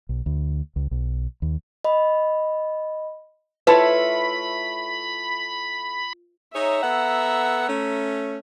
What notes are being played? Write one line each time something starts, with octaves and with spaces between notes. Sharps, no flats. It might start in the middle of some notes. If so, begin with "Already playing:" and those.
B1
D2
C#2
B1
D#2
D#5 B5
A3 E4 F4 B4 C#5 E5 A5 B5
D#4 G#4 C#5 E5 A#5
B3 A4 F#5
A3 C#4